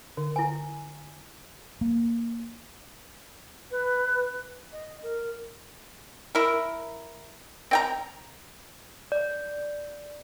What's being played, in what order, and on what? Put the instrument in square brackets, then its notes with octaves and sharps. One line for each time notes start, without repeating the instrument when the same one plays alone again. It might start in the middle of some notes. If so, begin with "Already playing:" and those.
[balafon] D3
[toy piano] E4 G#5
[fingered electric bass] A#3
[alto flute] B4
D#5
A#4
[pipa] E4 A#4
C4 G5 A#5
[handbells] D5